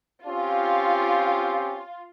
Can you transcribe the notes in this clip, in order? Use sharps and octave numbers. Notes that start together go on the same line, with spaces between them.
C4 C#4 F4 G4